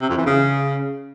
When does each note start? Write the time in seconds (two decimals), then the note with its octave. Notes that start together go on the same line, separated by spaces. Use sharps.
0.01 C3
0.09 F2
0.18 E3
0.26 C#3